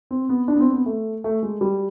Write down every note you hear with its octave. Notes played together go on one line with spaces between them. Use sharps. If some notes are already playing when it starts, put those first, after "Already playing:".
C4
B3
D4
B3
C4
B3
A3
A3
G#3
G3